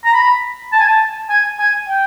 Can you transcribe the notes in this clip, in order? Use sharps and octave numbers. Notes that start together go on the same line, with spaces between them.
A#5
B5
A5
G#5
A5
G#5
G#5
G5